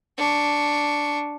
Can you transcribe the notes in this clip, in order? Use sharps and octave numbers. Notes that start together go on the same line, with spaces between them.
D4 C#6